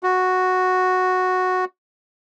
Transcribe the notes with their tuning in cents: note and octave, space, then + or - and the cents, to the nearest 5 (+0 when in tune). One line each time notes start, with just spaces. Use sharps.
F#4 -5